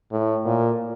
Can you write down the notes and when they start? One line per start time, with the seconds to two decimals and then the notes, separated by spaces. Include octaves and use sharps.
0.11 A2
0.46 A#2